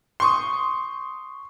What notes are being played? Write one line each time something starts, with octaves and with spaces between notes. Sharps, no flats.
C6 C#6 D#6